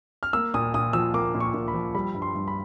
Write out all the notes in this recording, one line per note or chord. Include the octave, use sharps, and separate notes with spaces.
F6
A#3 E6
A#2 D#6
A#2 D#6
F3 E6
A#3 D6
A#2
C#6
A#2
B5
F3
G3 B5
G2
C6
G2
B5